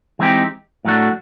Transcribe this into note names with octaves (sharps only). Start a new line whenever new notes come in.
E3 G#3 C4 D#4 G4
A2 F#3 A3 D4 F#4